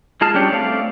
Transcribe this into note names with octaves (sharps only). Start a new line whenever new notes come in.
G#3 F4 G#4 A5 F6
G3 C#4 D4 G4 C#5
A3 C4 D5 F5